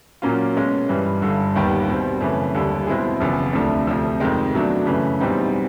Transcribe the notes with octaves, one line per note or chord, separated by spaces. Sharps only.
A#2 F#3 A#3 C#4 F4
B2 G#3 C#4
G2 E3 G3
G1 G2 D3
D#2 D#3 G3 B3
B2 G3 C4
F#2 C#3 E3 A3
D#2 D3 G3
B2 G#3 C4 E4 G#4
F#1 E2 C#3 F3
D2 C3 F3 A3 D4
D2 C3 F3
F2 C3 D#3 G#3
B2 F#3 A3 D4
F#2 C#3 E3 A3
E2 B2 G3 C4 D#4